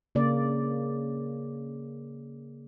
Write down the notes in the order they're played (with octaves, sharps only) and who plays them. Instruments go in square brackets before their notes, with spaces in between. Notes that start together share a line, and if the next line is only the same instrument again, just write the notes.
[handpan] C#3 A#3 D5